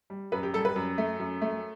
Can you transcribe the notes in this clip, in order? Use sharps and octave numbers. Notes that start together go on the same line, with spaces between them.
G3
F#2 B4
G4
G3 A4
B4
F#2
A3
F#2
A3